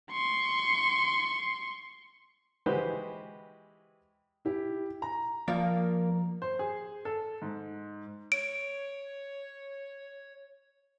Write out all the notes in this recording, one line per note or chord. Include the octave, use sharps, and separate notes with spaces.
C6 C#6
E3 G#3 F#4 G4 B4 C5
E4 G4
A#5
F3 A#3 D5 F5
C5
G#4
A4
G#2
C#5 D7